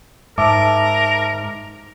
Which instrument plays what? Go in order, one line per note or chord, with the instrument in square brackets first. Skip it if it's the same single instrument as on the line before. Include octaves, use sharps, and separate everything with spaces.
[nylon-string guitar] G#2 [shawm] A#4 [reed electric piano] E5 A5 D6